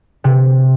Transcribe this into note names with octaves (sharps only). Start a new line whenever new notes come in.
C3